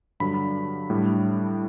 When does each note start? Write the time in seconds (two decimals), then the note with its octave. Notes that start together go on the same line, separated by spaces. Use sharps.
0.20 G2 D3 F#3 B5
0.90 A2 G3 D4